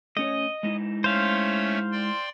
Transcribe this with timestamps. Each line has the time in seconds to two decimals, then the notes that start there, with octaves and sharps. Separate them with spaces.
0.17 A3 C#4 C#5 D#5
0.63 G#3 D#4 E4
1.04 A3 C#4 C5 C#5 F5
1.92 D5 G5 C6